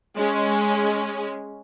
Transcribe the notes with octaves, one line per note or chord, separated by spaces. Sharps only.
G#3 C#4